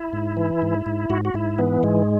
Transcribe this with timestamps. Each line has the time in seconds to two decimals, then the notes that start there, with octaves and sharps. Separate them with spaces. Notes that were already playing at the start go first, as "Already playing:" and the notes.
Already playing: E4
0.13 G#2
0.37 E3
0.62 G#2
0.86 G#2
1.10 G#2 F#4
1.25 F#4
1.34 G#2 E4
1.58 E3 B3
1.83 G#2 G#3